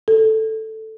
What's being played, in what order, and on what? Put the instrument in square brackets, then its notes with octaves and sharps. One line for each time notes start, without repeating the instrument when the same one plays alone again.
[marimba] A4